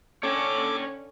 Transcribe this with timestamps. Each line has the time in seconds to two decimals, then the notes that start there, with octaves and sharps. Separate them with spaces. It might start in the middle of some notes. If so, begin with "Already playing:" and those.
0.23 D3 C#4 A4 C#5 G5 D6